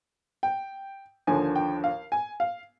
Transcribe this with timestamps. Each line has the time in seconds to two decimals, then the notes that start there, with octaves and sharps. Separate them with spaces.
0.43 G5
1.27 D#2 D3 F3 G#5
1.56 G5
1.84 F5
2.12 G#5
2.40 F5